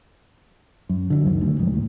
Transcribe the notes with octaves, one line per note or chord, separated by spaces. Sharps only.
F#2
D3 E3 F#3
C#2 F#2 D#3
D2
C2 F2 G#2
D#2 A2